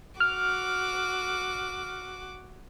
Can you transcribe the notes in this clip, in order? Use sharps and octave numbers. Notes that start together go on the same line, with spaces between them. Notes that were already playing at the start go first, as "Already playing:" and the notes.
F#4 D6 F6